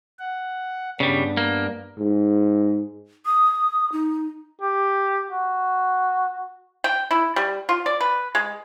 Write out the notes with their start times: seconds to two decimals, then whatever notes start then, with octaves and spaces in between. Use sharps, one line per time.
0.19 F#5
1.00 G2 C#3 G3 B3 D4
1.37 A#3
1.99 G#2
3.26 D#6
3.92 D#4
4.61 G4
5.29 F#4
6.84 G5
7.11 E4
7.36 G3
7.69 F4
7.86 D5
8.01 B4
8.35 G#3